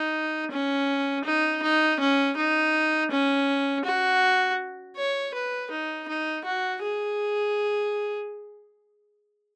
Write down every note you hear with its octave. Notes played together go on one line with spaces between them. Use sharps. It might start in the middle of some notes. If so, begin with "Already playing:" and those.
Already playing: D#4
C#4
D#4
D#4
C#4
D#4
C#4
F#4
C#5
B4
D#4
D#4
F#4
G#4